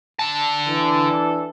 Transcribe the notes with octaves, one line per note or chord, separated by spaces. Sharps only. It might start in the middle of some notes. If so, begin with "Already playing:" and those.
D3 A5
E3 D4 A4